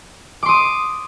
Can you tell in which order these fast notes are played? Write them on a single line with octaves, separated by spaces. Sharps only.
D6 C6 D#6